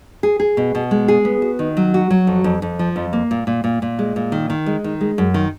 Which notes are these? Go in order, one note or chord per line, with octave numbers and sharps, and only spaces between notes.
G#4
G#4
B2
B2
G#3
G#4
B3
F#4
D#3
F#3
F#4
F#3
F2
F2
F2
F3
F2
A#3
A#2
A#2
A#2
A#2
G#3
A#2
D#3
D#3
G#3
D#3
G#3
F#2
D#3